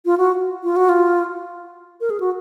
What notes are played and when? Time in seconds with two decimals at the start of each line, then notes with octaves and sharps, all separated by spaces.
0.06 F4
0.18 F#4
0.64 F4
0.76 F#4
0.89 F4
2.01 A#4
2.10 G#4
2.20 F#4